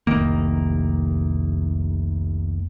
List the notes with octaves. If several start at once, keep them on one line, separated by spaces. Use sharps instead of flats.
F1 C2 D#3 A#3